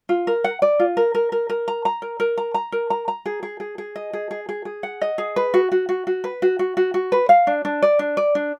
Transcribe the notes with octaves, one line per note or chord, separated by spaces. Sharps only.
F4
A#4
F#5
D5
F4
A#4
A#4
A#4
A#4
A#5
A#5
A#4
A#4
A#5
A#5
A#4
A#5
A#5
G#4
G#4
G#4
G#4
D#5
G#4
G#4
G#4
G#4
F#5
D#5
G#4
B4
F#4
F#4
F#4
F#4
B4
F#4
F#4
F#4
F#4
B4
F5
D4
D4
D5
D4
D5
D4